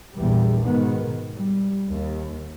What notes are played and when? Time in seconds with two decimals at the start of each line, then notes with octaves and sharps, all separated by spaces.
0.16 A#1 E2 G3
0.65 G#2 B2 D#3 B3
1.34 G3
1.89 D#2